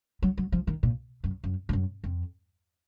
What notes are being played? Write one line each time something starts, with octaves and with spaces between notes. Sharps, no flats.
F#3
F#3
F3
D#3
A#2
F#2
F#2
G#2
F#2
F2